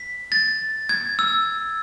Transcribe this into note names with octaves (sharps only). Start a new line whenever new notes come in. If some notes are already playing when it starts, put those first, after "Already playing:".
Already playing: B6
A6
G#6
E6